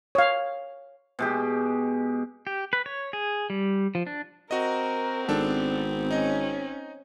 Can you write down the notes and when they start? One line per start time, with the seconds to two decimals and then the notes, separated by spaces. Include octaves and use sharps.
0.15 C#5 F5
1.19 B2 G#3 G4
2.47 G4
2.73 B4
2.86 C#5
3.13 G#4
3.50 G3
3.95 F3
4.07 D4
4.51 C4 F#4 A#4 D#5
5.29 G#1 B3 D4 A4
6.11 C#4 D#4 D#5